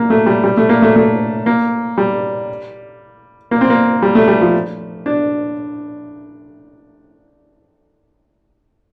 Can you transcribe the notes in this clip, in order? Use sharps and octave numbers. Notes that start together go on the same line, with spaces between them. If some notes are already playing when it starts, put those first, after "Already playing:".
Already playing: A#3
A3
G3
G3
A3
A#3
A3
A3
A#3
G3
A#3
C4
A#3
G3
A3
G3
F3
D4